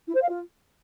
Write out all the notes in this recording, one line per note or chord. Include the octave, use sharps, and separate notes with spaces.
E4
C5
F5
F4